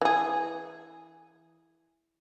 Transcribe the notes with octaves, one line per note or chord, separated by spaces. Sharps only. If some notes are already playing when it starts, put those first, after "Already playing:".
E3 G#4